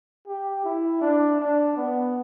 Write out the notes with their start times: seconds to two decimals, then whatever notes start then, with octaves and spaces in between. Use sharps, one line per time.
0.27 G4
0.65 E4
1.02 D4
1.40 D4
1.77 B3